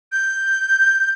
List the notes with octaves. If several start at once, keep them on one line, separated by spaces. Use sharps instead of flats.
G6